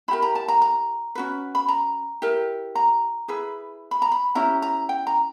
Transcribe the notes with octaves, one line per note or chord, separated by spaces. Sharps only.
E4 G4 A#4 B5
A#5
A5
A#5
A#5
C#4 F#4 B4
B5
A#5
E4 G4 A#4
A#5
E4 G#4 B4
B5
A#5
B5
C#4 E4 G4 A#5
A#5
G5
A#5